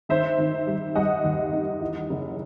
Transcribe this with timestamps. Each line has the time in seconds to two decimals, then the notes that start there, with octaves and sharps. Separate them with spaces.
0.09 D#3 C5 E5
0.38 D#3
0.67 G3
0.95 G3 D#5 F#5
1.24 D#2
1.53 D#3
1.81 E3
2.09 F#1